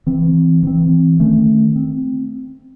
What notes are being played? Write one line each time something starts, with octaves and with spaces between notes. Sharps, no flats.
E3 C4
E3 C4
D#3 A3 C#4
C4